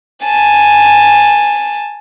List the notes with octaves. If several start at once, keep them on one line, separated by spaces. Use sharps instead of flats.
G#5 A5